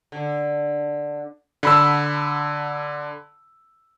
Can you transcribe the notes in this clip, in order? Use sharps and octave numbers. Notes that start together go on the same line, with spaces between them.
D3
D3 B5 E6